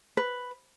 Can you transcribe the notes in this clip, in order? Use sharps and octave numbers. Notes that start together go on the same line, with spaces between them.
B4